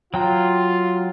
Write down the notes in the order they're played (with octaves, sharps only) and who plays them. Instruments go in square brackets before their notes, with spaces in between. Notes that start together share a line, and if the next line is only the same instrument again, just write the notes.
[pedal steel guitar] F#3 G5 A#5 [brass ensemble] F4